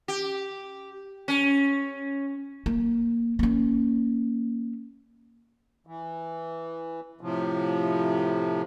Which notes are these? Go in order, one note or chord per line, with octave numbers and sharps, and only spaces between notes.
G4
C#4
A#3
A#3 C#4
E3
A2 C3 F3